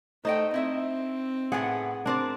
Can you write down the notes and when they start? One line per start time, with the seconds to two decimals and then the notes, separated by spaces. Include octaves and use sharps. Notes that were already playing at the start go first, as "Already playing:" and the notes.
0.25 A3 D#4 C5 D#5 G5
0.54 C4 E4 D#5 E5
1.52 A2 B3 G#4 F#5
2.06 C4 D4 A#4 D5